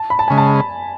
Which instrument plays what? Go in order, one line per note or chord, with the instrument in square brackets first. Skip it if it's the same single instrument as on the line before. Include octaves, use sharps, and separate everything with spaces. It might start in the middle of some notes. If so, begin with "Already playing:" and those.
Already playing: [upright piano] A5
B5
A5
[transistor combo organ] C#3 G#3 [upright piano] G#5
[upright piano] A5